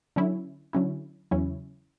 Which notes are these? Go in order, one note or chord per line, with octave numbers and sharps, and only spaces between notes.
D3 F#3 C#4 E4
D3 F#3 C#4 E4
E2 C#3 F#3 C#4 E4